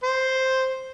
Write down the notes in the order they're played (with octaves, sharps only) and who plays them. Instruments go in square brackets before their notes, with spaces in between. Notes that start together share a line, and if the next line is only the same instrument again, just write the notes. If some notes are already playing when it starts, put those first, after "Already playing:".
[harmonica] C5